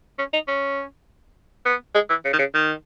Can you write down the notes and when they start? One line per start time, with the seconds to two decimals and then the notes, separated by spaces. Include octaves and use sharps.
0.19 C#4
0.33 D#4
0.48 C#4
1.65 B3
1.95 G#3
2.10 E3
2.25 C#3
2.33 D#3
2.39 C#3
2.54 D#3